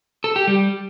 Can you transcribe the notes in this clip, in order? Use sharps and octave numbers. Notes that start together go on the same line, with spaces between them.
A4
G4
G3